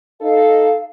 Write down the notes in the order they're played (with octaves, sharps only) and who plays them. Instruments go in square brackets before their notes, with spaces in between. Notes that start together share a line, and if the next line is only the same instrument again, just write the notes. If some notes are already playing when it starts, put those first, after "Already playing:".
[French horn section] D#4 A4 [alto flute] F5